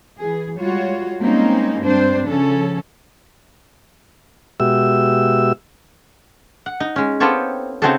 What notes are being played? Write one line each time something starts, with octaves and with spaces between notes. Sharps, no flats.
E3 G#4
G3 G#3 F4 F#4 C#5
G3 G#3 A#3 C4 C#4 D#4
G2 C4 D4 C5
C#3 F3 C#4 A4
B2 G#3 F#4 G4 E5 E6
F#5
D#4
G#3 C#4
B3 C4 F4 G4 A4 C#5
C#3 C4 D#4 F#4 G#4 A4